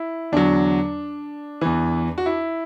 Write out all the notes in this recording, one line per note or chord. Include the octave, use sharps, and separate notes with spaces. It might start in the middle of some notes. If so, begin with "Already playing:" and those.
Already playing: E4
E2 D3 F#3 D4
E2 E3
F#4
E4